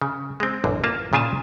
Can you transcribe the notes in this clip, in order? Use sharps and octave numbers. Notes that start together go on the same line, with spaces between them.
C#3
G#3 C4
A1 F#2 D3
A#3 F4 A5
A#2 C#3 F4 G#5 A5